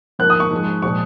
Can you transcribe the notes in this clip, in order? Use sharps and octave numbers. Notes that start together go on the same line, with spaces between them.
G#2 F3 A#3 F#6
D#6
C#6
G#2 F3 G#3
A#2 F3 G#3 C#6